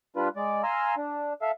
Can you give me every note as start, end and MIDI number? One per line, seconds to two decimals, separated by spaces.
0.16 0.28 55
0.16 0.28 62
0.16 0.28 65
0.16 0.28 71
0.36 0.62 56
0.36 0.62 74
0.63 0.95 77
0.63 0.95 80
0.63 0.95 82
0.63 0.95 84
0.63 0.95 88
0.97 1.33 62
1.42 1.51 69
1.42 1.51 76
1.42 1.51 77